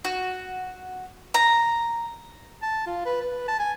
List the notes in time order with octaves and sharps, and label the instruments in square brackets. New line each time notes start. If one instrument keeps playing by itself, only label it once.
[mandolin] F#4
A#5
[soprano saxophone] A5
F4
B4
B4
A5
G#5